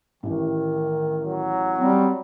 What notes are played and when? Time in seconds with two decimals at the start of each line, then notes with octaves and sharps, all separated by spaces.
0.23 A1 A2 D#3
1.25 F#3
1.78 G3 C4